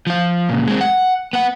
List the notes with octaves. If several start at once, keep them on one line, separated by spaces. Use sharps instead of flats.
F3 F4
A#2 C#3
G#3 C4
F#5
B3 F#5